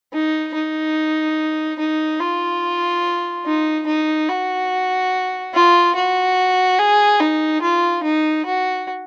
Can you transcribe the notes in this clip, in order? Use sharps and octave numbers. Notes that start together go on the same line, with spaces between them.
D#4
D#4
D#4
F4
D#4
D#4
F#4
F4
F#4
G#4
D#4
F4
D#4
F#4